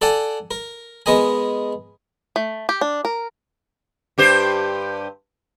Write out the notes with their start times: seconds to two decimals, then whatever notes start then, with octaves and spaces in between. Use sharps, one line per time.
0.02 A4 D5 F#5 G#5 A5
0.51 A#4
1.06 G#3 B3 A#4 D#5 G#5
2.36 A3
2.69 G4
2.81 D4
3.05 A#4
4.18 G2 G4 C5